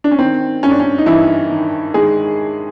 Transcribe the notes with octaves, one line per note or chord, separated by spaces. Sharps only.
D4
C#4
D#3 C4
G2 C#4
D4
C#4
D#4
G2 E3 E4
D#3
D#3 G#3 G#4